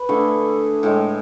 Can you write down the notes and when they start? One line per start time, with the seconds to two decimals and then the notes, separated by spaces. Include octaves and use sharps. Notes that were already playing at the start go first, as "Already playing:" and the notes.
Already playing: B4
0.09 D3 A3 E4 G#4
0.83 A2 G#3